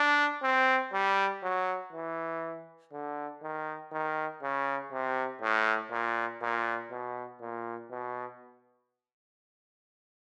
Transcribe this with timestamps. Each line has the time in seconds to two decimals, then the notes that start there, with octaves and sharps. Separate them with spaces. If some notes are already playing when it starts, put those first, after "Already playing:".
Already playing: D4
0.43 C4
0.93 G3
1.43 F#3
1.92 E3
2.92 D3
3.42 D#3
3.92 D#3
4.42 C#3
4.92 C3
5.41 A2
5.91 A#2
6.42 A#2
6.91 B2
7.41 A#2
7.91 B2